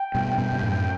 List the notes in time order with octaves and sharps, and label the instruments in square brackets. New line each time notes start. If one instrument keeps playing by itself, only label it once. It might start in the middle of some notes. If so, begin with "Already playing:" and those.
Already playing: [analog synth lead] G5
[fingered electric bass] G2 B2
G2 B2
G2
F#2 A2